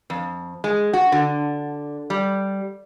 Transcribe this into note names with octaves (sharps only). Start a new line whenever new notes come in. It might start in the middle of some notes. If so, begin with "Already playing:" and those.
F2
G#3
F#4
D3
G3